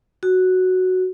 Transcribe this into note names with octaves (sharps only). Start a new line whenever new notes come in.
F#4